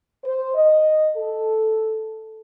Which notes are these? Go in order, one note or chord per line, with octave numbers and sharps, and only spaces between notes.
C5
D#5
A4